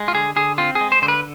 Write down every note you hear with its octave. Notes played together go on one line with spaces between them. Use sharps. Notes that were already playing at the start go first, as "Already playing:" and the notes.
Already playing: G#3
F4
D3 G#4
D3 G#4
C4 F4
G#4
G#3
C5
D3 C5
B4